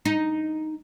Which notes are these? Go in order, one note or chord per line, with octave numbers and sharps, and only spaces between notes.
D#4